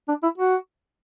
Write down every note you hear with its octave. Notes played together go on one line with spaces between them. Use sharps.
D4
E4
F#4